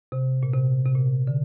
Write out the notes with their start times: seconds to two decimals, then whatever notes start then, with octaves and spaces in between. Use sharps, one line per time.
0.12 C3
0.43 A#2
0.53 C3
0.86 C3
0.95 A#2
1.27 D3